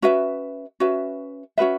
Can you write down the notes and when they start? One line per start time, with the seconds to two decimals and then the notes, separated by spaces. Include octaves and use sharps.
0.02 C#4 F#4 B4 E5
0.80 C#4 F#4 B4 E5
1.58 C#4 F#4 B4 E5